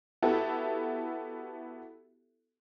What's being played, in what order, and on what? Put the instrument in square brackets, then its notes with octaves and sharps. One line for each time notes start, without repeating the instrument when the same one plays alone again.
[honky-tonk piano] B3 E4 F#4 G4 A4 E5